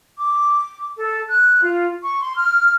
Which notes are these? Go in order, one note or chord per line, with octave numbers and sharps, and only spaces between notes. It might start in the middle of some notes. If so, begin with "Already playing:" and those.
D6
A4
F#6
F4
C#6
C6
F6